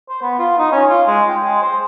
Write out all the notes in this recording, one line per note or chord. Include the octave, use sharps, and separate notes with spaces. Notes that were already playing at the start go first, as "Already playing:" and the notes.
C5
B3
F4
D#4
C#4
F4
G#3
G5
G#3
C5